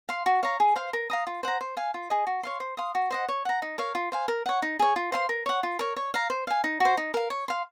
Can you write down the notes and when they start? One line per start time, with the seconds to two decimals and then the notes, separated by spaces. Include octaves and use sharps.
0.09 F5 C6
0.26 F#4
0.43 C#5 F5 A#5
0.60 G#4
0.76 C5 F5 C6
0.93 A#4
1.10 F5 A#5 D#6
1.27 F4
1.43 C5 F#5 A#5
1.61 C5
1.77 F5 G#5
1.94 F4
2.10 G#4 D#5
2.27 F#4
2.43 C#5 F5 C6
2.60 C5
2.77 F5 C6 D#6
2.95 F#4
3.11 C5 D#5 F#5
3.29 C#5
3.45 F#5 A#5
3.62 D#4
3.78 A#4 C#5 F5
3.95 F4
4.12 C5 F5 G#5
4.28 A#4
4.46 C#5 F#5
4.62 D#4
4.79 G#4 C#5
4.96 F4
5.12 C5 F5 C6
5.29 A#4
5.46 C#5 F#5
5.63 F4
5.79 A#4 C#5
5.96 C#5
6.14 F5 A#5
6.30 C5
6.47 F5 G#5
6.64 D#4
6.80 F#4 C5
6.97 D#4
7.14 A#4 F5
7.30 C#5
7.48 F5 C6